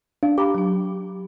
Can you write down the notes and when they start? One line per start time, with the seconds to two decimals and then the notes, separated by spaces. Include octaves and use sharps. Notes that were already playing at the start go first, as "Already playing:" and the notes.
0.23 D4 F5
0.38 G4 A#5 B5 D6
0.55 F#3 D4